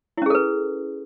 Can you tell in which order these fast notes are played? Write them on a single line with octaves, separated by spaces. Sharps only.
E4 C#4 G#4 A4 B4